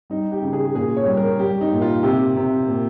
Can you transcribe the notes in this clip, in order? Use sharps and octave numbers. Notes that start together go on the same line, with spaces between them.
G3 D#4
G4
C#3
G#4
A#2 G#4
C#5
G3
A#4
G3 G4
D#4
A#2
F4
C3 G4
C3
A#2